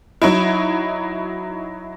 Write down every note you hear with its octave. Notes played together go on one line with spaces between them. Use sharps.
F#3 D#4 E4